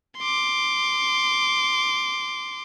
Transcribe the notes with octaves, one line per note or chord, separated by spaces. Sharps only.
C6 D6